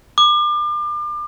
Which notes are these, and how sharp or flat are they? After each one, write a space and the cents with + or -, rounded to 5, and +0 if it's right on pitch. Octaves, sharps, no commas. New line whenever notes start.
D6 +35